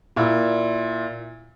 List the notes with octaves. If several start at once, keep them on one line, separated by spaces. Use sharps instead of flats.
A#2 E4